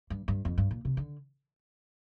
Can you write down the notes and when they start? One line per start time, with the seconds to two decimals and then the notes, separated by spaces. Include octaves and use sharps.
0.10 G2
0.28 G2
0.45 F2
0.58 G2
0.71 A#2
0.85 C3
0.97 D3